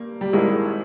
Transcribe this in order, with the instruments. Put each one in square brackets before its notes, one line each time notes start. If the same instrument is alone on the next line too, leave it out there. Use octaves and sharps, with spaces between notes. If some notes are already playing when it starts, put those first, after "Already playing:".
Already playing: [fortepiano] G2 [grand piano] A#3
[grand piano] G3
[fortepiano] G#1 G#2 D#3 A#3 E4 [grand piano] G#3